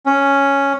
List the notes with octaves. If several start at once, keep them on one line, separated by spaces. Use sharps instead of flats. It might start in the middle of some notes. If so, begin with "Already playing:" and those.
C#4